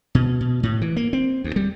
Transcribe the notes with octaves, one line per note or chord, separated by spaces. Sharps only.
B2
B2
A2
E3
A#3
C4
D2
G3